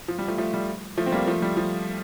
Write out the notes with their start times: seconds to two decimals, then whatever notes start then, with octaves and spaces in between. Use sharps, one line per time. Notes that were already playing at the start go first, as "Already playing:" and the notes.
0.08 F3
0.19 G3
0.28 F3 A3
0.38 F3 A3
0.54 G3
0.97 F3 A3
1.06 C4
1.12 G3 A#3
1.27 F3 A3
1.42 G3
1.57 F3